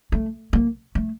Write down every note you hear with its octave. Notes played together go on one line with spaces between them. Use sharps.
A3
A#3
A3